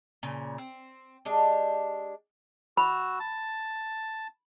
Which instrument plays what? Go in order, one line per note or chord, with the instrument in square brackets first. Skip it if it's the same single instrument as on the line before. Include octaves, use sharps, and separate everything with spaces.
[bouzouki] A#2 C#3
C4
G#3 D4 G4
[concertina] F#4 E6 [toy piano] B5
[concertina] A5